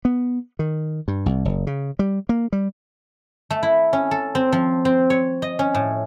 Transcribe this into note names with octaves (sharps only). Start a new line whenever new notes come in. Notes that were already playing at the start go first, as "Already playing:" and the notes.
B3
D#3
G2
C2
F#1
C#3
G3
A#3
G3
A3
E4
C#4
A4
C4
F3
C4
C#5
D#5
C#4
A2